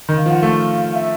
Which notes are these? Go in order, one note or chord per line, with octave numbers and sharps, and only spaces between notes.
D#3
F5
F3
F#5
A3 F5
E5